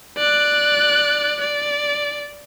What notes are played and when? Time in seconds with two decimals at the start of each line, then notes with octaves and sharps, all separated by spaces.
0.18 D5 F#6
1.41 D5